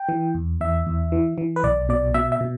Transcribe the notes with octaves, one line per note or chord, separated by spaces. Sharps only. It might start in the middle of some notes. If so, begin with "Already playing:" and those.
Already playing: G5
E3
E2
E2 E5
E2
E3
E3
B4
B1 D5
B2 D5
B2 E5
E5
B2